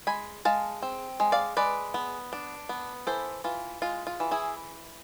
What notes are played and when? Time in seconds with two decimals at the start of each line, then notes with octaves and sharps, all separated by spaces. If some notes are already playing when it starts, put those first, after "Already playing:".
0.07 G#3 G#5 B5
0.45 G#3 F5 A5
0.82 C4
1.20 G#3
1.32 D5 F5
1.57 G#3 B4 D5
1.94 B3
2.33 D4
2.69 B3
3.07 E3 A4 C5
3.44 E3 F4
3.82 G#3 F4
4.07 F4
4.20 E3
4.31 E4 G#4